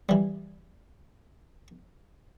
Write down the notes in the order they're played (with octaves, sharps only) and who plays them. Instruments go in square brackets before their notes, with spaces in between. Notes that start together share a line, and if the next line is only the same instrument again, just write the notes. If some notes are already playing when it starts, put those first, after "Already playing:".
[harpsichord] E3 G3